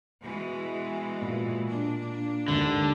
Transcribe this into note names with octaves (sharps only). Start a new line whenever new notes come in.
B2 E3 G#3
A#2
A#3 D4
G#1 D#2 D3